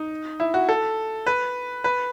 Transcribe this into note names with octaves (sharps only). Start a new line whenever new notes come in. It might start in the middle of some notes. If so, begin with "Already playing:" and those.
Already playing: D#4
E4
F#4
A4
B4
B4